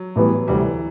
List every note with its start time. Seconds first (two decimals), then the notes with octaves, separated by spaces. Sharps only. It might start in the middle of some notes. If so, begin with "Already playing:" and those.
Already playing: F#3
0.16 A2 E3 G3 B3
0.48 D2 C3 E3 G3 C4